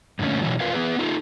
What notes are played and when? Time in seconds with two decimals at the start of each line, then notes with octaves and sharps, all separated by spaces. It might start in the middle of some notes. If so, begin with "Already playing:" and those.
0.19 G2 A#2 D3 A3 C#4
0.42 B2 E3 F#3
0.60 F4 A#4 B4 F5
0.73 B3 G#4 B4
0.99 D#4 F4 A4